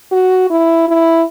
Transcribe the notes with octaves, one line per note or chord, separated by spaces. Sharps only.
F#4
E4
E4